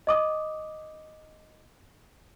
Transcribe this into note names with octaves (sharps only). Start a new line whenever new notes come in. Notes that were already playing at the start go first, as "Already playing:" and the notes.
D#5 D6 D#6